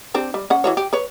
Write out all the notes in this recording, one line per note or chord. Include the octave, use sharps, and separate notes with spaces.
C4 D4 G4
G3
C#4 F#5
E3 F#4 C#5
G4
B4 C#5